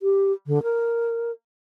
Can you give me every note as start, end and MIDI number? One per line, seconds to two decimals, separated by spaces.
0.01 0.32 67
0.47 0.63 50
0.63 1.31 70